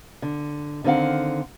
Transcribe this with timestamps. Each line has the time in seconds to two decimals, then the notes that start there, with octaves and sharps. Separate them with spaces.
0.22 D3
0.84 D3 D#3 C4 F5 F#5